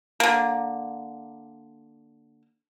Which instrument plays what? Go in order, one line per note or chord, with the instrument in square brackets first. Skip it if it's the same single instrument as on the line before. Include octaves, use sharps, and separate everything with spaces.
[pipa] D3 A#3